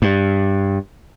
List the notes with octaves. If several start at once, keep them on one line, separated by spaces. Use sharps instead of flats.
G2